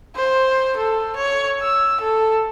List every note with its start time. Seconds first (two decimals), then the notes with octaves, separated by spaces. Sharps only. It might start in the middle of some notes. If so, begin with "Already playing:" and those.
0.16 C5
0.76 A4
1.16 C#5
1.61 E6
2.01 A4